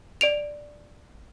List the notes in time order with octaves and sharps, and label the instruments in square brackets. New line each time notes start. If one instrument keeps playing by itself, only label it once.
[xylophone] D5 D7 F7